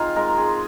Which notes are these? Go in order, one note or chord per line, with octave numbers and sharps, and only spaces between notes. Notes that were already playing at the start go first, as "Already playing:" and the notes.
Already playing: C4 D#4 F4 G#4
G#3 A#4
G#4